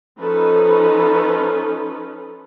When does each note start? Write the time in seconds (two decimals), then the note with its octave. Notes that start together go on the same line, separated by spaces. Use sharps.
0.20 F3 C#4 D#4 A4 B4